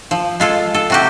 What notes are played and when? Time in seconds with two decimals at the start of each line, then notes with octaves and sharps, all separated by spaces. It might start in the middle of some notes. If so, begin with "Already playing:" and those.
0.11 F3
0.40 G#3 F4 A4
0.74 A4
0.90 C3 F#4 G4